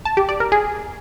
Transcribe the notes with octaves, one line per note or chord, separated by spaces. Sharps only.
A5
G4
D5
A#4
G#4